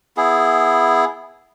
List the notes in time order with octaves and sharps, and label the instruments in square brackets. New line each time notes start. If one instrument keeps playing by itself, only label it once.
[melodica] B3 E4 G#4